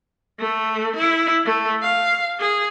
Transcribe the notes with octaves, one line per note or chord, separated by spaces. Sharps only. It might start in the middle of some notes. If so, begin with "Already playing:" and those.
A3
E4
A3
F5
G#4